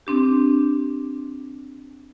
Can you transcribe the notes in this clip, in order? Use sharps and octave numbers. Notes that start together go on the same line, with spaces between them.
C4 D4 G4